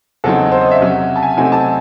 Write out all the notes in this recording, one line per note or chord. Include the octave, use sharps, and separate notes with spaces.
E2 C#3 F#3 C4 D#4 A4
C5
D#5
E5
C3 F#3 C#4
A5
G#5
C3 F#3 A3 C4 D#4 G#5
A5